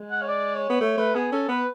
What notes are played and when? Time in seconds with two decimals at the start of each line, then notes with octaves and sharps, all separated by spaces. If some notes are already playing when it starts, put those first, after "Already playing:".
Already playing: G#3
0.11 F#5
0.21 C#5
0.28 D5
0.55 C#5
0.70 B3
0.81 A3 C#5
0.97 A3 B4
1.15 B3 G#4
1.32 C#4 A4
1.49 B3 B4